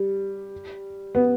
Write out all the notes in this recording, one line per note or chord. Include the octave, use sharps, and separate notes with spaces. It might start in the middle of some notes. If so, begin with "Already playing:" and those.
Already playing: G3
B3